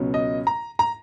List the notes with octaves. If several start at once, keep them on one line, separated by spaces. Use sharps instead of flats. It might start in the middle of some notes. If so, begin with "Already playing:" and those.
Already playing: C#2 B2 F#3 C#4
D#5
A#5
A#5